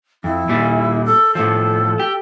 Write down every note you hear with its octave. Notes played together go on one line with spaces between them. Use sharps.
F2 E4
A#2 G3
A4
A2 F3 A4
G4